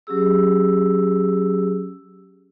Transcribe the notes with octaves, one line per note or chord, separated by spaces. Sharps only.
F#3 C#4 G4 G#4 E6